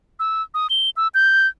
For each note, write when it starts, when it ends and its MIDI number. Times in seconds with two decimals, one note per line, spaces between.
0.19 0.42 88
0.54 0.67 87
0.70 0.90 103
0.97 1.08 88
1.14 1.47 91